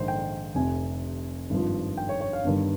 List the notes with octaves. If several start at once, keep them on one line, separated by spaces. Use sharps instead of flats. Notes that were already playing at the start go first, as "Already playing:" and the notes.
Already playing: A#1 G#2 D#3 C5
G5
F1 F2 C3 G#5
G#1 G2 F3
G5
C#5
C#5
F5
G1 G2 D#3